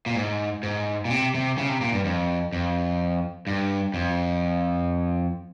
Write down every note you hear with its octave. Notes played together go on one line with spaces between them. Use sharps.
A#2
G#2
G#2
A#2
C3
C3
C#3
C3
A#2
G2
F2
F2
G2
F2